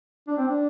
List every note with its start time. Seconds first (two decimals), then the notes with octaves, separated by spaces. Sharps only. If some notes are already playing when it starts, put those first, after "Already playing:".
0.28 D4
0.38 C4
0.48 D4